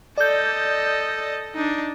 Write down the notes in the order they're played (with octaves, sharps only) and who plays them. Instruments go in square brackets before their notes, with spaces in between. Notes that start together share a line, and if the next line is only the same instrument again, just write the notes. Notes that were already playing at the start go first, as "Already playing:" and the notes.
[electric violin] A4 D#5 [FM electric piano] D5 G6
[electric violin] D4 D#4